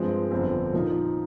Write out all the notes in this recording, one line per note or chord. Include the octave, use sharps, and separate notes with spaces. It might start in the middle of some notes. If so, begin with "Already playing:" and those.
Already playing: G2 F3 G#3 C4
G1 F2 D3 F3 C4
A#2 F3 A#3 D#4